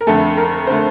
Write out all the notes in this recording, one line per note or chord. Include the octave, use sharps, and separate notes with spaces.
A#4
F2 D3 A3 A4
A#4
D3 A3 C5